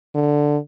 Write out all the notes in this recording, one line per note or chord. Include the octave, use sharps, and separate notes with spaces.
D3